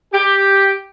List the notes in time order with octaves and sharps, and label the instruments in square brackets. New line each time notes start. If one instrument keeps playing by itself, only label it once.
[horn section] G4